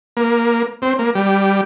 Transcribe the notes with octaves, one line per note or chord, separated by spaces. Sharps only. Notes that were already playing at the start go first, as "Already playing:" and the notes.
A#3
C4
A#3
G3